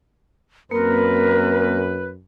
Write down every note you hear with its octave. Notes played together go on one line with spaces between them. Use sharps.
F#2 A#3 C4 A#4 B4